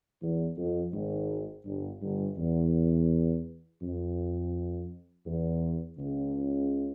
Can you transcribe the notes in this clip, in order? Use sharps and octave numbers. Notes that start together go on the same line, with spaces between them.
E2
F2
G#1 G#2
G1 G2
G1 G2
E2
F2
E2
C#2 C#3